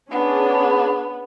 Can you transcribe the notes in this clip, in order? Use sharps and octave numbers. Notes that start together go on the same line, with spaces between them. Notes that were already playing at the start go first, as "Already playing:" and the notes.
B3 C#4 D4 G#4